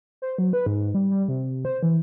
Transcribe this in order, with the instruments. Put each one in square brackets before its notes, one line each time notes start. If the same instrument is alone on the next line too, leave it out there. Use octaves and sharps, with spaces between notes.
[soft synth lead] C5
F#3
B4
G#2
G3
G3
C3
C5
E3